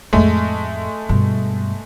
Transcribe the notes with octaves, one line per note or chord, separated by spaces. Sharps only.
F2 A2 G#3 A3
G2 B2